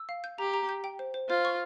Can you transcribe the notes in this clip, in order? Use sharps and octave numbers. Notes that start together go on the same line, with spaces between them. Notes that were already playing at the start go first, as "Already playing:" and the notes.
Already playing: E6
F5
G6
G4 A#5
A#5
G6
G5
C5
C5
F4 C5
C#6